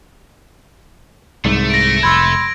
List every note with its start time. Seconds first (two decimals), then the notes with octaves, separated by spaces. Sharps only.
1.45 C2 G#2 A3
1.70 A#6 D7
2.03 F1 B5 C6 E6 G#6